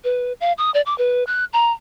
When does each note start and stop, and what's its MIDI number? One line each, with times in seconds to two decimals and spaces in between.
0.04 0.33 71
0.41 0.53 77
0.58 0.71 87
0.74 0.81 74
0.86 0.96 86
0.98 1.24 71
1.27 1.45 90
1.53 1.72 82